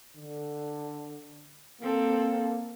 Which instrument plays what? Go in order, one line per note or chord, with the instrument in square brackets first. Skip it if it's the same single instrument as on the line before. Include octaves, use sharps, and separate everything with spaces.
[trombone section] D3
[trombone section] A#3 [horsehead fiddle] C4 A4